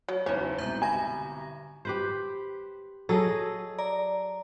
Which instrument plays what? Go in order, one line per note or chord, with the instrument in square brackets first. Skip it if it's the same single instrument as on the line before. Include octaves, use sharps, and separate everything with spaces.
[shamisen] F#3 [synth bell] F#4
[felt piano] F#1 E2 [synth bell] D#4 E4 [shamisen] C#5
[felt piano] C2 G#2 B2 [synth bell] E5 A#5 G6
[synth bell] D3 B5 A#6 [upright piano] G#5
[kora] G4 B4 C5
[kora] F#3 G#4 D#5 [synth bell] A4 A5 E6
[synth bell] D5 A#5